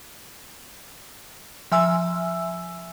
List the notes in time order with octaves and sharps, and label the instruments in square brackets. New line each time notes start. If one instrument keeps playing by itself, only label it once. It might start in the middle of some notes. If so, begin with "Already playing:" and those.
[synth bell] F3 E5 G#5 E6